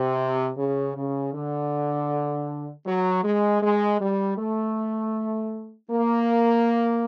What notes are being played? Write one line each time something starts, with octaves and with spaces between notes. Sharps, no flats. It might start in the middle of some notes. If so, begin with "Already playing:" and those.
Already playing: C3
C#3
C#3
D3
F#3
G#3
G#3
G3
A3
A#3